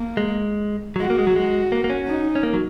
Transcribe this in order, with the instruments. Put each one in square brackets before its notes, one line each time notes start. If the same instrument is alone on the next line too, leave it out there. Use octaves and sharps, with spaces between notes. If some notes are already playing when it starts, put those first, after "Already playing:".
Already playing: [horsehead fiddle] A#3
[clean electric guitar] G#3
F#3
[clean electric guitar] G#3 [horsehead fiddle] F#4
[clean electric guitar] A#3
G#3
F#3
G#3
A#3
A#3
C#4
[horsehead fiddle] D#4
[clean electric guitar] C#4
A#3
F#3